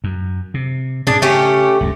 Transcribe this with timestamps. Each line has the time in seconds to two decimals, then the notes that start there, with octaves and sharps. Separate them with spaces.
0.04 F#2
0.54 C3
1.07 G#2 B2 D4 G#4
1.22 C#3 A3 C#4 G4
1.81 F#1 C#2 G2